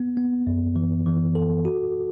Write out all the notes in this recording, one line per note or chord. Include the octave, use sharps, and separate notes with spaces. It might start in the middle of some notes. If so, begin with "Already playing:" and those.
Already playing: B3
B3
F#2
E3
E3
A4
F#4